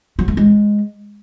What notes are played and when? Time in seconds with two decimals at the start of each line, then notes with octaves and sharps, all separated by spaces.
0.19 F#3
0.28 A3
0.37 G#3